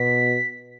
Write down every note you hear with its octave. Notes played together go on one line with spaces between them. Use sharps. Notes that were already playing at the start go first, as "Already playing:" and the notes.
Already playing: B2 B6